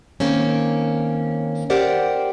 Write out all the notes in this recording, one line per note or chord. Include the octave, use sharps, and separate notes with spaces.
D#3 A#3 C4 C#4
G4 A#4 C5 D5 F#5 G5